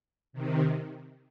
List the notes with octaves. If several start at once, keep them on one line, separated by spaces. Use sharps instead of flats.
C3 D#3